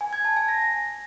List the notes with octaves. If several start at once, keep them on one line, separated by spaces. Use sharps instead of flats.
G#5
G#6
A5
G#5
A#6